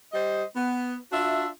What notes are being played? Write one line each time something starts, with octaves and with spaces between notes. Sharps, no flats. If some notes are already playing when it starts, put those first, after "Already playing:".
G3 C5 D#5
B3
D4 F4 F#4 E5